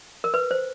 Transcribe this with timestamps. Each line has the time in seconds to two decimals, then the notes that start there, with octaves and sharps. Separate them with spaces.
0.24 A#4
0.34 B4
0.51 C5